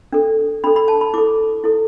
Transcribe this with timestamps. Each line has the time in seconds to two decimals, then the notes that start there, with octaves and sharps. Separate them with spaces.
0.13 D4 A4
0.64 D4 A4 B5
0.76 B5
0.88 A5
1.01 B5
1.14 E4 A4 D6
1.64 E4 A4